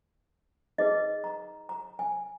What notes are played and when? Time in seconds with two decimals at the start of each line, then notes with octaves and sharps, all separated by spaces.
0.78 D#4 G#4 B4 D#5
1.24 A#5
1.69 A#5
1.99 G#5